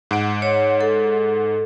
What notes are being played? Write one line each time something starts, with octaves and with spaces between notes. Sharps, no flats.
G#2 F#5 D7
C#5
A4